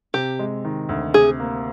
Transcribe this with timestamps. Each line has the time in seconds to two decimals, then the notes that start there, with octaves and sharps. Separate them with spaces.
0.14 C3 G4
0.39 G#3
0.65 D#3
0.89 D2
1.14 C3 G#4
1.40 A#3